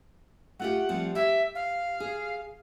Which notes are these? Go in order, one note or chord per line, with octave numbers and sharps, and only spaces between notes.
A3 F4 G4 F#5
F3 G3 C4
G4 E5
F5
G#4